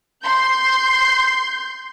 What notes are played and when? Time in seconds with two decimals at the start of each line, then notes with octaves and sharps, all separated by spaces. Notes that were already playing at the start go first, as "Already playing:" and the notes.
0.24 C6 G6